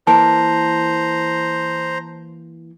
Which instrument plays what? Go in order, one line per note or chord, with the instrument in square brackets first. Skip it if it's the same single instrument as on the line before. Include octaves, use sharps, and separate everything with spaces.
[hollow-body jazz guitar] E3 A#3 A#4 [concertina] C5 A#5 [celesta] A5